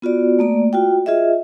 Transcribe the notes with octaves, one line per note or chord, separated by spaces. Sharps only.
B3 F4 F#4 D5
A3 A#3 D5
F4 F#4 G5
F4 G#4 D#5 E5